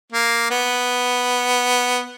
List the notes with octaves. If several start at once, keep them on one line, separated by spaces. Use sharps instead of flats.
A#3
B3